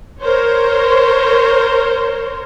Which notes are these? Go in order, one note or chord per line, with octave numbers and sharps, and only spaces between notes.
A#4 C5 C#5